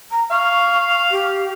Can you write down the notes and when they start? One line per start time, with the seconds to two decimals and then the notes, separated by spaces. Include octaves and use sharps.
0.11 A#5
0.31 F5 C#6
1.11 G4